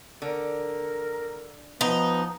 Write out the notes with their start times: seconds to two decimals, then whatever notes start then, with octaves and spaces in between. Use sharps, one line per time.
0.22 D3 A#4
1.81 F3 B3 D#4